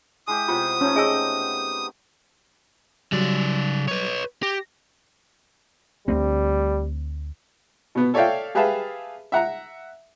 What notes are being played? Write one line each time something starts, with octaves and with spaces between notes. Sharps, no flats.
G#3 E4 G4 D#6
C3 B3 F4 C#6
A3 C#4 D#4
G#4 D#5 G#5 E6
C#3 F#3 G3 D5
B4 C#5
G4 A#6
D2 G3 A3 C4
B2 B3
A4 C#5 D5 E5 F5 G5
G4 G#4 B4 E5 F5 A5
E5 F#5 A#5